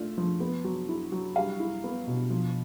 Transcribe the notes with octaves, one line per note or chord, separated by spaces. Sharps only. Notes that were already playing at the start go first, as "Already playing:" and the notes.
Already playing: A3 D4 F4
F3
B3
F#3
E4
F#3
G3 F5
E4
B3
B2
F3